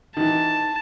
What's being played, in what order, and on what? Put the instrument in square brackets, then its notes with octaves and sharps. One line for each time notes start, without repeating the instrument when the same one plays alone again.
[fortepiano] D#3 E3 [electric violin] A5